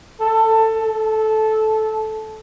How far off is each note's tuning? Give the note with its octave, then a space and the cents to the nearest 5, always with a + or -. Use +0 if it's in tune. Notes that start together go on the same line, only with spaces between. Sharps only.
A4 +20
A4 -15